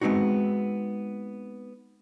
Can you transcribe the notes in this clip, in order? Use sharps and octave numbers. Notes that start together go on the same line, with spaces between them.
G#3 B3 C4 D#4 F#4